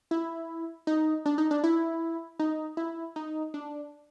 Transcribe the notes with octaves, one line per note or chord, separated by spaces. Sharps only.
E4
D#4
D4
D#4
D4
E4
D#4
E4
D#4
D4